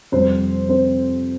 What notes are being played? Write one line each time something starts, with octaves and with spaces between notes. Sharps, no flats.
F2 C3 G3 C4 C5
C4 C5